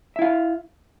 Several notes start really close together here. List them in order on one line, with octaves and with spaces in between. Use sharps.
E5 E4 F5